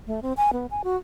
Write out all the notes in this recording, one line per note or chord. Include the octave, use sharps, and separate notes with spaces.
A3
C4
G#5
B3
G#5
F#4